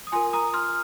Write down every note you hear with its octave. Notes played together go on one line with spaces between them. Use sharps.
D#6
F4 A#4 G#5 C6
A#5 D#6
C6 F6